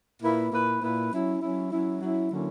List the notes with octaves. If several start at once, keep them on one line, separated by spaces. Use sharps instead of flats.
A#2 A#3 E4 B4
A#2 A#3 E4 B4
A#2 A#3 E4 B4
F#3 C#4 E4
F#3 C#4 E4
F#3 C#4 E4
F#3 C#4 E4
D3 F#3 A#3 C#4 E4